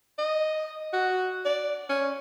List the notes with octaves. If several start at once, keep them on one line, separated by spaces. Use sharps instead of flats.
D#5
F#4
D5
C#4